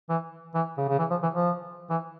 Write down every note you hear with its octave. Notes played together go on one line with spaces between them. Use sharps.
E3
E3
C#3
C#3
E3
F3
E3
F3
E3